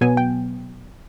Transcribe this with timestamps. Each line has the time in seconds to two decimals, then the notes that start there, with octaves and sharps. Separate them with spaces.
0.01 B2 F#3 B3 G#5
0.17 G5